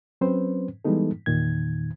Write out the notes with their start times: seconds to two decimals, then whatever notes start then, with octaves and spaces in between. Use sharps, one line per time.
0.21 F#3 C4 C#4 B4 C5
0.85 E3 G3 G#3 B3 D#4 A4
1.26 E2 A#2 D#3 G#6